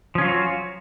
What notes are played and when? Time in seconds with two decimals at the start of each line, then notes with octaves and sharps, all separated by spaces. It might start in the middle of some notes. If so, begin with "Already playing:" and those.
0.15 F3
0.18 C#4
0.21 F4
0.24 F#3
0.27 F#4